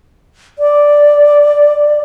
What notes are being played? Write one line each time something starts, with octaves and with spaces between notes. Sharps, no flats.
D5